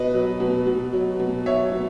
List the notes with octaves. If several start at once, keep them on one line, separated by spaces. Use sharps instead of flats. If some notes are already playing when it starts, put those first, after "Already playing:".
Already playing: B2 B4 D#5
F#3
B2
B2
F#3
B2
F#3 C#5 E5
B2